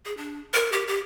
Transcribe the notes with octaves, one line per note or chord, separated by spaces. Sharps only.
G#4
D4
A#4
G4
G4